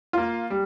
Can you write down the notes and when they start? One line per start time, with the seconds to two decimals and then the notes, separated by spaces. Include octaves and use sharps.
0.13 A#3 F4
0.50 G3